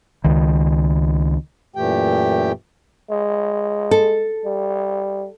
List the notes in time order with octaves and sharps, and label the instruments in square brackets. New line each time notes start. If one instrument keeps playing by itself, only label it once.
[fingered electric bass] C#2 D#3
[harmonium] F#2 A#2 E3 A3 G4 G5
[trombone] G#3
[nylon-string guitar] A4
[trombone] G3